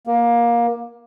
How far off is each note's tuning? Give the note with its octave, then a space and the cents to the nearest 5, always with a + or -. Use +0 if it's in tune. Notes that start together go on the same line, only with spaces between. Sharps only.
A#3 +20